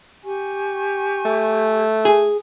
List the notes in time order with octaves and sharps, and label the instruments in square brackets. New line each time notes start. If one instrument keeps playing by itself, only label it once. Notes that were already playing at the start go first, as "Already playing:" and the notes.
[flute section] G4 G#5 C#6
[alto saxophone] A3
[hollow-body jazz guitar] G#4